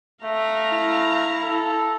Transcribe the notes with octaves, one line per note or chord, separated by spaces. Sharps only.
A3 F5 A#5
E4
A4